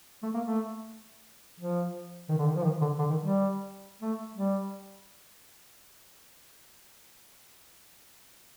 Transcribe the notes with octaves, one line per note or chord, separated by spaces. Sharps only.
A3
A#3
A3
F3
D#3
D3
D#3
F3
D#3
D3
D3
D#3
G3
A3
G3